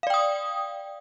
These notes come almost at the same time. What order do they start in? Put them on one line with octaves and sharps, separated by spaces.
F5 D5 G5 D#6